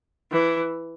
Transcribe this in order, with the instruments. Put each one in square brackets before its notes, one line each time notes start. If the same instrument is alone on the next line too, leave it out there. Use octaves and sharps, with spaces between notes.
[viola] E3